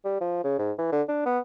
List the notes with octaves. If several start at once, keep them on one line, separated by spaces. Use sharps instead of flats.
G3
F3
C#3
G#2
E3
D3
D4
B3